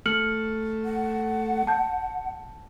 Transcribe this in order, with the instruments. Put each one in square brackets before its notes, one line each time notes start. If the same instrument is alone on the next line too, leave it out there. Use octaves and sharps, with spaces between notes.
[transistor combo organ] A3 [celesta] F6 C#7 F#7
[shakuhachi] F#5
[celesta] A5 G6